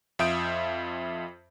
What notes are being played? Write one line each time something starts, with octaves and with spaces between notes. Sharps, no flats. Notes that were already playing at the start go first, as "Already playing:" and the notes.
F2 F4 E5 D#6 G6 D7